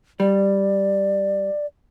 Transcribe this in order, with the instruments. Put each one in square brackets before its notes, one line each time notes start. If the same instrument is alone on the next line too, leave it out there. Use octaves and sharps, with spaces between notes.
[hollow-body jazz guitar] G3 [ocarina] D5